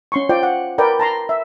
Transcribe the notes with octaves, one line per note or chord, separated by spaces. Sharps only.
C#4 C6 C#6
F4 C5 D5 G5
F#5
A#4 B4 D5 G5
A5 A#5 C6
E5